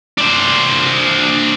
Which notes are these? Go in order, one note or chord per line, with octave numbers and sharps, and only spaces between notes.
D4 C5